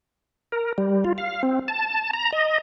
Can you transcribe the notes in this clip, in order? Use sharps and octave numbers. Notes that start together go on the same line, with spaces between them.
A#4
G3
F4
F5
C4
A5
A#5
D#5